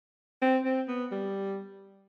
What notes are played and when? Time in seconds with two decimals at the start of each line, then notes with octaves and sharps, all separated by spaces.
0.42 C4
0.65 C4
0.88 B3
1.12 G3